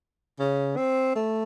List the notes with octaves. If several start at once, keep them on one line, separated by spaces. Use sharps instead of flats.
C#3
C4
A3